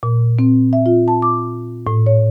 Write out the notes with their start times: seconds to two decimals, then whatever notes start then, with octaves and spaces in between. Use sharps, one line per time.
0.03 A#2
0.39 C4
0.73 E5
0.86 F4
1.08 A5
1.22 D6
1.87 A2
2.06 C#5